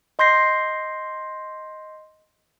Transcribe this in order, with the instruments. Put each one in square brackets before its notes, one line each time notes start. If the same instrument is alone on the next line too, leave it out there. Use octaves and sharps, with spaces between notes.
[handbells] D#5 C6 G6 A#6 C7